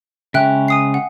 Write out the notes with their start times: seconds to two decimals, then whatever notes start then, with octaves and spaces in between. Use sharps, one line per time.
0.34 C#3 G#3 C#4 E5 G5 F#6
0.68 G#5 D#6 C7
0.94 F#5